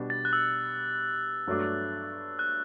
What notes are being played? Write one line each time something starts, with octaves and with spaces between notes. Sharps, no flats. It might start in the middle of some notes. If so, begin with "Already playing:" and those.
Already playing: B2 G3 B3 D4
A6
F#6
E6
G2 F#3 A3 D4
F#6